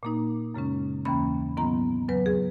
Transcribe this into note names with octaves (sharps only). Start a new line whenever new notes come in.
A#2 A#3 D#4
F#2 C#3 G#3 C#4
D#2 C#3 E3 A#3 C#4 B5
G#2 D#3 F#3 B3 E4 A#5
E2 C#3 F#3 B4
G#4